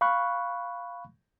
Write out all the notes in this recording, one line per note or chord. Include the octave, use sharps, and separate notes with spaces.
F5 B5 C#6 F#6